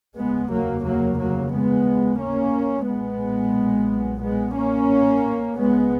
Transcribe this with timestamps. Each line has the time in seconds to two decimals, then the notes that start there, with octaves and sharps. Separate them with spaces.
0.17 F1 D#2 C#3 G#3 B3
0.51 F#3 A#3
0.85 F#3 A#3
1.19 F#3 A#3
1.52 G#3 B3
2.20 A#3 C#4
2.86 B1 A#2 G#3 B3
4.22 G#3 B3
4.55 A#3 C#4
5.56 C#2 C#3 G#3 B3